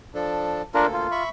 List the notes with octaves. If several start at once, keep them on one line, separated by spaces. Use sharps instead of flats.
F3 D4 A4
D2 A#3 D4 F4 A4 A#4
F4
E5 B5 C#6